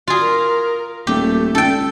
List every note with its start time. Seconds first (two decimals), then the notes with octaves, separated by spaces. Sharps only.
0.08 F4 F#4 G#4
0.21 A#4
1.07 D#1 A3 G4
1.55 C#2 A4 G5